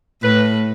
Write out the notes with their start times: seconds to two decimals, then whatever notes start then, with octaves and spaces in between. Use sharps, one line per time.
0.23 A2 B4